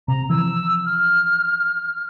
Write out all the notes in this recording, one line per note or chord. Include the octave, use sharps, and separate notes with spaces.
C3 A#5
E3 F3 E6
F6